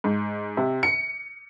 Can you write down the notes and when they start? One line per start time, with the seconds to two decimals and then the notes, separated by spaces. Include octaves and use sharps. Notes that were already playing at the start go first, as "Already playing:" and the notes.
0.04 G#2
0.57 C3
0.83 C#7